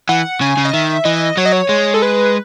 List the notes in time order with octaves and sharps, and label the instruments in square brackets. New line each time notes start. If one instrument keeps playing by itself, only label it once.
[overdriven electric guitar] E3 [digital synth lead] F#5
[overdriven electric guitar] C#3 [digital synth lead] G#5
[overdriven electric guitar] C#3
[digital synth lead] D#5
[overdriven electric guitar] D#3 [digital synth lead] E5
[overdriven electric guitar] E3 [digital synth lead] D#5
[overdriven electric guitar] F#3 [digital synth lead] C#5
[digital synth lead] D#5
C#5
[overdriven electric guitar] G#3
[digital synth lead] A4
B4